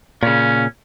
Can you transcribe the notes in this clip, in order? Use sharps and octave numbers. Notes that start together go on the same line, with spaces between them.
A#2 C#3 C#4